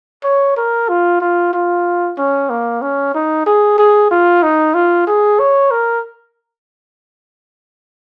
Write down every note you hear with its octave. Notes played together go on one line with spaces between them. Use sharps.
C#5
A#4
F4
F4
F4
C#4
A#3
C#4
D#4
G#4
G#4
F4
D#4
F4
G#4
C#5
A#4